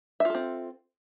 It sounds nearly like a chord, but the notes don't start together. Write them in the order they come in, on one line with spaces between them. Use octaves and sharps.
E5 F4 A4 C4